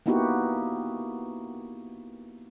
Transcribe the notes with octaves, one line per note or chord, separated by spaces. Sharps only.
A#3 B3 D#4 E4 F#4 G4